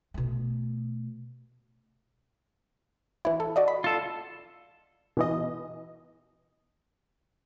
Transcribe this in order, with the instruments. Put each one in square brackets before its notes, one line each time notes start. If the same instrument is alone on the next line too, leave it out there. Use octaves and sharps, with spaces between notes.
[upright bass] B2 A3
[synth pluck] E3 E4
A4
F#4 D5 D#5
B5
[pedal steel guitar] F4 A4
[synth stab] B2 E3 D#5